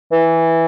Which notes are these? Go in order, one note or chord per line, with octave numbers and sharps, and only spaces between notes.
E3